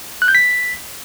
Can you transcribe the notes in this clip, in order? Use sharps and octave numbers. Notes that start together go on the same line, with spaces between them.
F#6
G6
B6